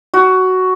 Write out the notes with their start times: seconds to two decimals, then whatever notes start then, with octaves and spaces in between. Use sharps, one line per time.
0.14 F#4